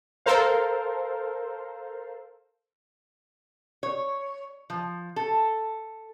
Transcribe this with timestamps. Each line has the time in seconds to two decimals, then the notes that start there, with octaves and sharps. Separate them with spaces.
0.26 A4 A#4 C5 F5
3.83 C#5
4.70 F3
5.16 A4